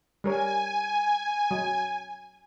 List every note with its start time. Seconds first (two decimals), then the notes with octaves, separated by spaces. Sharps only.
0.24 G3 A#4 C#5 G#5
1.51 F#3